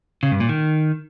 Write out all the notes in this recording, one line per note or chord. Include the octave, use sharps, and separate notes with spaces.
C#3
G2
A#2
D#3